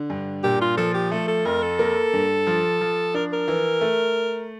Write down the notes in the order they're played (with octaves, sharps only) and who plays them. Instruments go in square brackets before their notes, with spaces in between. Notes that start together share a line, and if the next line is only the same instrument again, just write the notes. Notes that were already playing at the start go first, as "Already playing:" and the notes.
Already playing: [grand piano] D3
G2
[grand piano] A#2 [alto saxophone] G4
[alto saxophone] F4
[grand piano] F3 [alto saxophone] A4
[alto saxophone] G4
[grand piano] A3 [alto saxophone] A4
[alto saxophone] A4
[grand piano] F2 [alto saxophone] A#4
[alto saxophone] A4
[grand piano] A#3
G2
F3
F3
[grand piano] D4 [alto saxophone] A#4
[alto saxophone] A#4
[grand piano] E3
A3